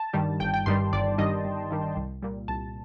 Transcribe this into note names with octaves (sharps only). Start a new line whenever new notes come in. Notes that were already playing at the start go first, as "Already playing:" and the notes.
Already playing: A5
G2 D#3 G3
G1 G5
G5
G2 D#3 G3 C6
G1 D5
G2 D#3 G3 D#5
G1
G2 D#3 G3
C2
A#2 G3
C2 A5